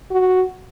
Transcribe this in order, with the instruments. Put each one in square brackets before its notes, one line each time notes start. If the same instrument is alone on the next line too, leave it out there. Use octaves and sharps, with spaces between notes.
[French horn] F#4